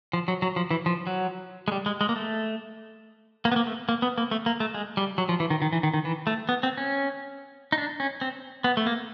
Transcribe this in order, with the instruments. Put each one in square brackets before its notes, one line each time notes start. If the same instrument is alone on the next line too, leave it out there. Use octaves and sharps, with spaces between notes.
[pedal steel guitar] F3
F#3
F#3
F3
E3
F3
F#3
G#3
G3
G#3
G#3
A#3
A3
A#3
B3
A#3
A3
A#3
B3
A#3
A3
A#3
A3
G#3
G3
F#3
F3
E3
D#3
D#3
E3
D#3
D#3
E3
A3
B3
C4
C#4
D#4
D4
C#4
C4
B3
A3
A#3